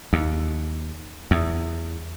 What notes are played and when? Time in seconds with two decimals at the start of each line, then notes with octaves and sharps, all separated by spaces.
0.13 D#2
1.31 E2